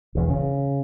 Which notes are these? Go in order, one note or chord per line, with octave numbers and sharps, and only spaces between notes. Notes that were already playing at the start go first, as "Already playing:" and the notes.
E1 E2
C#3